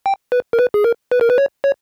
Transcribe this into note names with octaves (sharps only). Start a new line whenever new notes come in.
G5
B4
A#4
B4
G#4
A#4
B4
A#4
B4
C#5
C#5